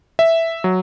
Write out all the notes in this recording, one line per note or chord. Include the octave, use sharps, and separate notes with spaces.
E5
F#3